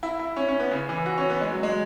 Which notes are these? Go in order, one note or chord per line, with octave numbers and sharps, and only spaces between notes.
E4
E4
C#4
C#4
B3
C#3
E3
F#4
C#4
B3
G#3
F#3
G#3